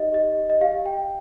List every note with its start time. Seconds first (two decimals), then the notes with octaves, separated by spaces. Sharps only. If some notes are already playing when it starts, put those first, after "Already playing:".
Already playing: D#4 G4 D#5
0.12 G4 D#5
0.37 G4
0.50 D#5
0.61 G4 F5
0.85 G4 G5